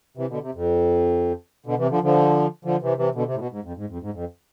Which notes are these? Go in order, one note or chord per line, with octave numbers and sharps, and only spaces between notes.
C3 E3
B2 D3
C3
F2
B2 D3
C3 E3
D3 F3
D3 F3
D3 F3
C3 E3
C3 E3
B2 D3
C3
A2
B2
G#2
F2
G#2
F2
G#2
F2